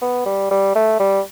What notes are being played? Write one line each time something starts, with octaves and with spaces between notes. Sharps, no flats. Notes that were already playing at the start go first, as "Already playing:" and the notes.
B3
G3
G3
A3
G3